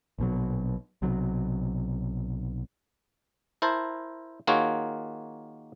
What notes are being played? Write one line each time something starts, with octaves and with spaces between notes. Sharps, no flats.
A#1 B2 F#3
B1 C3 F#3
E4 A#4 C5 A5
D#3 A#3 F4 F#4 G#4 C#5